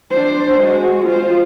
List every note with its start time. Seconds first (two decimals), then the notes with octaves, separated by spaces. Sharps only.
0.11 D4 C5
0.60 G#3 F#4
1.05 F4 C5